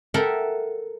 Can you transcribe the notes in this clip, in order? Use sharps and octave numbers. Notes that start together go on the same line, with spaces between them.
A4 A#4 E5 F#5 G5